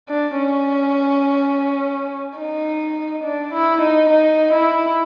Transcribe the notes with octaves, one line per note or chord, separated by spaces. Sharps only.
D4
C#4
D#4
D4
E4
D#4
D#4
E4